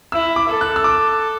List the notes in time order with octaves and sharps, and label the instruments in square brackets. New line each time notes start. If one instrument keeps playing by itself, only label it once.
[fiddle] E4 [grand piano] E6
[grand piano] D6
[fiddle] A4
[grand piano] F#6
E6
D6